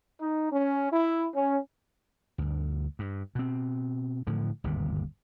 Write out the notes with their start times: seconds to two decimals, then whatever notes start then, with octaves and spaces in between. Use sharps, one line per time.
0.21 D#4
0.52 C#4
0.92 E4
1.35 C#4
2.38 D2 G2
2.99 G2
3.35 B2 C4
4.27 A2 D3 F3
4.64 G1 D#2 G#2 C3